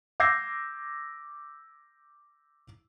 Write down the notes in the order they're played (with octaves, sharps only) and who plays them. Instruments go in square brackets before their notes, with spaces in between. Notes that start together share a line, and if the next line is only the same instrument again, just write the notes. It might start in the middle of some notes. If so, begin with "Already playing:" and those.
[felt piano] D6 E6 G6 G#6 A#6 C7